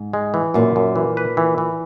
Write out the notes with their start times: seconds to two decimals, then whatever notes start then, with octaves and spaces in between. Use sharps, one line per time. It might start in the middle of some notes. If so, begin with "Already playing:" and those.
Already playing: G#2
0.13 G#3
0.34 E3
0.54 F#2 A#2
0.76 F#2
0.96 E3
1.17 B4
1.37 E3
1.58 E3